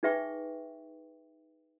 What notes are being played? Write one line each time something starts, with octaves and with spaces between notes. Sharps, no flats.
D#4 G#4 B4 E5 G5 C#6